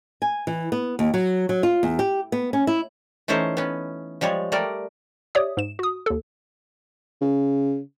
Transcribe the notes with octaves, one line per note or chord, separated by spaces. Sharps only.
G#5
E3
B3
D#2
F#3
F#3
F4
E2
G4
B3
C#4
E4
E3 A3 C#4 D#4 C5 C#5
B3 C#4
F3 G3 G#3 C#5
G3 A3 A#4 D5
G4 C#5 D5 E5 D#6
G#2 E7
F#4 D#6
D#2 A4
C#3